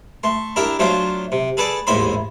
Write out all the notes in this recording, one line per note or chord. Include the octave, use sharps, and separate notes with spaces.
A3 C6
D4 E4 G4 A#4 E5
F#3 A3 D4 F4 C5
C3
G#4 A4 B4 D5
A1 D#2 G#2 E5 B5 C6